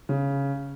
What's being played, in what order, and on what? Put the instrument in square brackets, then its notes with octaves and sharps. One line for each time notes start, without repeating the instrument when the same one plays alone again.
[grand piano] C#3